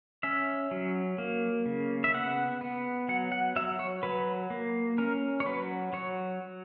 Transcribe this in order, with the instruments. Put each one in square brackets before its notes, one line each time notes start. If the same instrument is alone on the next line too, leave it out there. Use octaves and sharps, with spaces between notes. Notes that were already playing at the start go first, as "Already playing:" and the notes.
[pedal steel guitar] C#4 E5
F#3
A#3
C#3
E5
B3 F#5
B3
F#3 F#5
F#5
F#3 E5
C#5
F#3 B4
A#3
C#4 A#4
C#5
F#3 B4
F#3 C#5